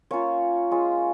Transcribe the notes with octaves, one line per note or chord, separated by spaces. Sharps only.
A#3 C#4 F4 C#5
G#3 C#4 F4